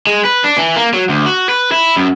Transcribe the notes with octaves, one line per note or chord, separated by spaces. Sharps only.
G#3
B4
D4
E3
A#3
F#3
D2
F#4
B4
E4
F#2